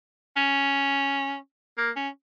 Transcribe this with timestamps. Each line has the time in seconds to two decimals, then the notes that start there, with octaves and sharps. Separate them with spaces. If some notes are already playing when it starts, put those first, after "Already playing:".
0.37 C#4
1.78 A#3
1.96 C#4